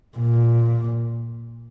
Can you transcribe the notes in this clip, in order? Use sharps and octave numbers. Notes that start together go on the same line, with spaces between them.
A#2